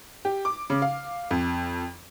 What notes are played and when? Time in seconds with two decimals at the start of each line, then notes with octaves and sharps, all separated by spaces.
0.25 G4
0.45 D6
0.70 C#3
0.82 F5
1.31 F2